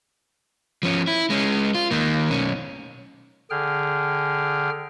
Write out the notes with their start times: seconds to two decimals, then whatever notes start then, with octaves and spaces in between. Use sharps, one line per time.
0.83 F3 C#4
1.07 E4
1.30 G#3 C#4
1.75 F4
1.91 D#3 A#3
2.30 B1 C#4
3.51 D3 G#4 G5 F6